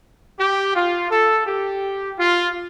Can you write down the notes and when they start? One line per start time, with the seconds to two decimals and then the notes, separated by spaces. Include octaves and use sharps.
0.40 G4
0.75 F4
1.10 A4
1.46 G4
2.18 F4